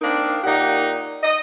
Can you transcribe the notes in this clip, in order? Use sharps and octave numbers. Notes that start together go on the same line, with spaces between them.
A#3 C4 D4 D#4 A#4
A#2 A#3 D#4 G4 F#5
D#5